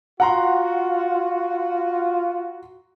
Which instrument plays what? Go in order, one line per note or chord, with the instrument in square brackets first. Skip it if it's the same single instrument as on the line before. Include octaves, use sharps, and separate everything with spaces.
[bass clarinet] F4 [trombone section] F#4 [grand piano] F#5 A#5 C6